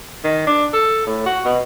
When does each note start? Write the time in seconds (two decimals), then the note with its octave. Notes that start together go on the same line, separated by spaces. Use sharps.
0.24 D#3
0.47 D4
0.73 A4
1.07 A2
1.26 F#4
1.45 B2